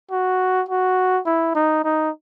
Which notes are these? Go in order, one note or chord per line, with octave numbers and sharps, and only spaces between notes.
F#4
F#4
E4
D#4
D#4